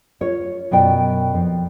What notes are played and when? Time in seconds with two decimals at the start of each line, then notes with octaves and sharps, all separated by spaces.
0.21 F4 C#5
0.71 F#2 B2 D5 G5
1.34 F2